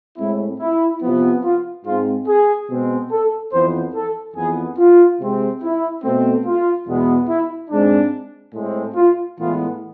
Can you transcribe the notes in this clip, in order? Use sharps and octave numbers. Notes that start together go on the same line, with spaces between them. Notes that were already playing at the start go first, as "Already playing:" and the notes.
A2 G#3 C4 E4
E4
C3 F3 B3
F4
G#2 G#3 C4 F4
G#4
B2 G#3 C4
A4
F2 E3 B3 C5
A4
F2 E3 B3 G#4
F4
C3 G#3 C4
E4
B2 A3 C4
F4
E2 B2 G#3 B3
E4
G#2 G#3 C4 D4
A2 G#3 C4
F4
A2 E3 G#3 B3 F4